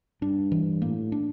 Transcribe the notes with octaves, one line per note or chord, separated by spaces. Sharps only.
G2 D4
E3
A2 A#3
D4